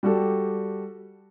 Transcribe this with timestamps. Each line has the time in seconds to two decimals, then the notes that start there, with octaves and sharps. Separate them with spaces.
0.03 G3 F#4 G4 A4